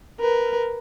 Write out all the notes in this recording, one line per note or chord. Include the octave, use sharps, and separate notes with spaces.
A#4 B4